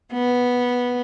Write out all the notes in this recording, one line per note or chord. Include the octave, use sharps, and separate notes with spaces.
B3